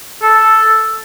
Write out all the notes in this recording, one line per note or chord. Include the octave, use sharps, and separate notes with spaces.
A4